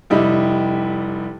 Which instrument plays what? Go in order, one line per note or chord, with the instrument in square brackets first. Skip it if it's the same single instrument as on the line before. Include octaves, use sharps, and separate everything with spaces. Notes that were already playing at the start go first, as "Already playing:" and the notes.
[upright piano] F1 G3 E4 G4 D#5